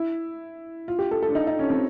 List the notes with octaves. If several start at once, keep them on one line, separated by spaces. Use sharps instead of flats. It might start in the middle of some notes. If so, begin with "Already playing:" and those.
Already playing: E4
F4
G4
A4
A4
D4
D#4
D#4
C#4
C4